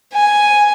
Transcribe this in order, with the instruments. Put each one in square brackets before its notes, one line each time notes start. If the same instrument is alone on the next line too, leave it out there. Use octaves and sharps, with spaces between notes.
[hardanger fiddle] G#5